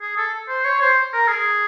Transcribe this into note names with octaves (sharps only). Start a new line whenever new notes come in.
G#4
A4
C5
C#5
C5
A#4
G#4